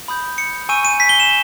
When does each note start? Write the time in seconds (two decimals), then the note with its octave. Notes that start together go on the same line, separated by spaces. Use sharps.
0.08 B5 D#6 G6
0.38 C#7
0.69 G#5 C#6 E6 G6 D#7
0.85 D#7
1.00 B6
1.09 G7
1.20 E7